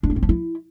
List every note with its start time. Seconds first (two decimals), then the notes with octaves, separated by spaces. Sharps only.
0.03 D4
0.10 A#3
0.16 C4
0.23 F3
0.29 E4